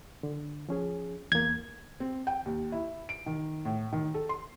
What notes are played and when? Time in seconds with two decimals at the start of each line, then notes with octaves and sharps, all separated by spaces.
0.23 D3
0.69 F3 C#4 G#4
1.32 E2 A#3 G#6
2.00 C4
2.27 G5
2.46 D#2
2.72 E4
3.09 D7
3.26 D#3
3.65 A2
3.92 D#3
4.14 A4
4.29 C6